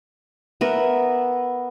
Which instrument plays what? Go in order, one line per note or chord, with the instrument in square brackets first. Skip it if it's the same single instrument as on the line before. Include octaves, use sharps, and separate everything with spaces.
[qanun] B3 A#4 E5